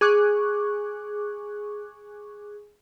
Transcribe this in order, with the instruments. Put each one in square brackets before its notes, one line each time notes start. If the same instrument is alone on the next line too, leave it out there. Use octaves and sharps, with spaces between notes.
[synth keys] G#4 C#6 D6 F#6